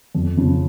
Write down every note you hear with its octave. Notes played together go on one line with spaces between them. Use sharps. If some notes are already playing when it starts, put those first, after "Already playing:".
F2
C#3 F3